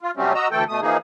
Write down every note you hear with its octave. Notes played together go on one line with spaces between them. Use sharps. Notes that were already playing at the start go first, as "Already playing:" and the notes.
F4
C3 F#3 G3 A3 C4 C#4
F#4 D#5 A#5 E6
D2 E3 A3 A4 G5
B2 A3 D#6
E3 F3 A#3 D#4 G#4